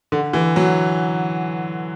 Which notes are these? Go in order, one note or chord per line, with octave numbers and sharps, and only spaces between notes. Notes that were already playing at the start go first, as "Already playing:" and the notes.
D3
E3
F#3